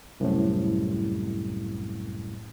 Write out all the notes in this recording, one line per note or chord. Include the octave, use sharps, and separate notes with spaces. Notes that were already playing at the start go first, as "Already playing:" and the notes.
C2 F#2 A2